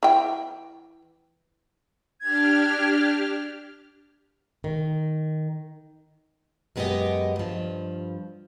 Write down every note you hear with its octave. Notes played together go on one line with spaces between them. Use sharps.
E3 G5
D4 G4 F6 G#6
D#3
F#2 G#3 B3 D#4 G4 D#5
G2 F3